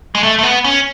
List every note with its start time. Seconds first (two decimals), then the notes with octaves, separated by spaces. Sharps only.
0.15 G#3
0.23 A3
0.39 A3
0.43 B3
0.64 C#4